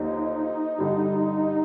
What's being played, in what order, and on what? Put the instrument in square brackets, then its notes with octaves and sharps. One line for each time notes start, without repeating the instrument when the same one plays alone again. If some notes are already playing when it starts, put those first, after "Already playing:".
Already playing: [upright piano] D#2 D3 F3 [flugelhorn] D#4
[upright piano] G2 D3 G3 D4